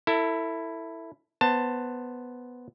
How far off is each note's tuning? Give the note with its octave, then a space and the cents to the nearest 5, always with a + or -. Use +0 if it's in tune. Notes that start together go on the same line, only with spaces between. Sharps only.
E4 +0 A4 +30
B3 +0 C5 +0 A5 +15